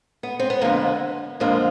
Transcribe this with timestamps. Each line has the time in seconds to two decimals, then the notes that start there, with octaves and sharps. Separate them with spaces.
0.23 B3
0.39 C4
0.50 B3
0.62 F2 D3 F3 G#3 A#3
1.40 F2 D3 F3 G#3 A#3